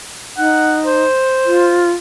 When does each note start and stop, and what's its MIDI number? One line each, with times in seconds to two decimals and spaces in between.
0.38 1.05 63
0.38 0.79 78
0.86 1.91 72
1.46 1.91 65